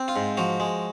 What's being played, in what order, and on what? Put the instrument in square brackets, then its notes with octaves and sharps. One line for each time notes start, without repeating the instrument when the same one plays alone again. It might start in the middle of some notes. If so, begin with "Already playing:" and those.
Already playing: [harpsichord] C4
F4
G#2
F3 F#4
G#3